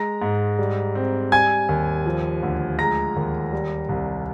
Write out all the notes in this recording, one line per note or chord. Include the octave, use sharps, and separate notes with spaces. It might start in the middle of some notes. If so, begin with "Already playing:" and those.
Already playing: G#3 A#5 A#6
G#2
G3
C4
G3 G#5 G#6
D#2
F3
D2
G#3 A#5 A#6
D#2
G3
C2